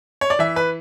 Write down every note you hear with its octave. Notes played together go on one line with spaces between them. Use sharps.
C#5
D5
E3 E5
B4